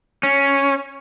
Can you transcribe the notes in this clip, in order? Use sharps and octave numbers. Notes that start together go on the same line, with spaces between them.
C#4